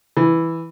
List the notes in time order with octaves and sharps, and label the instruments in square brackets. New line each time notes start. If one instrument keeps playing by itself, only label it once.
[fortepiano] E3